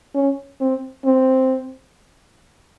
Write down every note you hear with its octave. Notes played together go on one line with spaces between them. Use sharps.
C#4
C4
C4